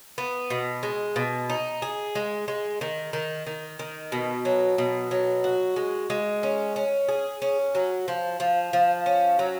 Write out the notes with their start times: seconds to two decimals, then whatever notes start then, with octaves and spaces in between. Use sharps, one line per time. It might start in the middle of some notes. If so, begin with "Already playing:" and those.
0.18 B3
0.50 B2
0.83 G#3
1.16 B2
1.50 D#4
1.82 G#4
2.15 G#3
2.48 G#3
2.81 D#3
3.13 D#3
3.47 D#3
3.79 D#3
4.12 B2
4.45 F#3
4.78 B2
5.11 F#3
5.44 F#4
5.76 G#3
6.10 G#3
6.43 C#4
6.76 C#4
7.08 G#4
7.42 C#4
7.75 F#3
8.08 F3
8.40 F3
8.73 F3
9.06 C#4
9.39 F#3